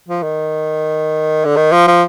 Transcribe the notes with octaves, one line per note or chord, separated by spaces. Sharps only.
F3
D#3
D3
D#3
F3
F3